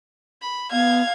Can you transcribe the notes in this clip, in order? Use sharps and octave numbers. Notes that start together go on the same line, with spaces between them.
B5
B3 F5 G#6